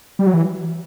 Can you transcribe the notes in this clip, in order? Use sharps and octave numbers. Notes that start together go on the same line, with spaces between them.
G3
F#3
E3